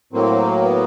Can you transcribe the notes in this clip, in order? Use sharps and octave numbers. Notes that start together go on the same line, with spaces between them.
A2 F#3 A#3 C4
B3